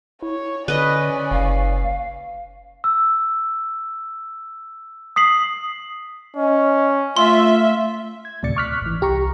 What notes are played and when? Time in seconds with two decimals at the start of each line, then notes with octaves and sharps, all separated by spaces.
0.22 E4 C#5
0.68 D3 C#4 B4 D5 D#5
1.31 F#1 F5
2.84 E6
5.16 D#6 B6 C7 F#7
6.36 C#4 D#5
7.17 A3 F4 E5 C6
8.25 G#6
8.43 D2 A2 C3 D5 A6 C#7
8.56 C#6 D6 F6 F#6 B6
8.82 G#1 E3
9.01 C2 G4 A#5 C#6